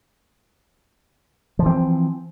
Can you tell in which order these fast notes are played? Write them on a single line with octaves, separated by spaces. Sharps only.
F3 E3 C4